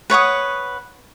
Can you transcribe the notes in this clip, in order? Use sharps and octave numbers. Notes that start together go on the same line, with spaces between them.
B4 C#5 F#5 D#6